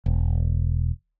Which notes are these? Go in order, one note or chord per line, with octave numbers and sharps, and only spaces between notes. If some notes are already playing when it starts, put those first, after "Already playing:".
E1